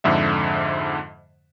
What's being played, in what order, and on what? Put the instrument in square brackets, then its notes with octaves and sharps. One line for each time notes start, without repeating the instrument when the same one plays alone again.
[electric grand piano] F2 G#2 D3 E5